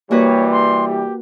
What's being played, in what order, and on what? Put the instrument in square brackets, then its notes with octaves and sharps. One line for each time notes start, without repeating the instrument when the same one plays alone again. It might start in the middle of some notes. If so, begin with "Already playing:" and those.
[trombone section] E3 G3 [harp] A#3 F#4 B4 [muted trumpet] C#5
[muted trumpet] C6
G4